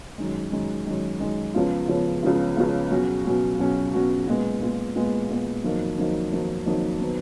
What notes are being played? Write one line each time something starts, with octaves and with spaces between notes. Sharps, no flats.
F#2 D#3 G#3
F#2 D#3 G#3
F#2 D#3 G#3
F#2 D#3 G#3
C#2 C#3 F3 B3 F4
C#2 C#3 F3 B3 F4
C#2 C#3 F3 B3 F4
C#2 C#3 F3 B3 F4
B2 F#3 C#4 F#4
B2 F#3 C#4 F#4
B2 F#3 C#4 F#4
B2 F#3 C#4 F#4
A#2 G#3 B3
A#2 G#3 B3
A#2 G#3 B3
A#2 G#3 B3
F2 D#3 F#3 A#3 D#4
F2 D#3 F#3 A#3 D#4
F2 D#3 F#3 A#3 D#4
F2 D#3 F#3 A#3 D#4
D#3 F#3 B3